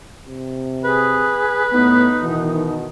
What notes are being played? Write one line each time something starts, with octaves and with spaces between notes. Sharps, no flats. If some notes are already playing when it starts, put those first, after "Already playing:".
C3
G#4 B4
A2 B3 D#4
B2 D#3 E3